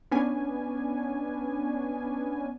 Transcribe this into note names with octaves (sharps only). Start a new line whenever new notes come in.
B3 C#4 D4 G#5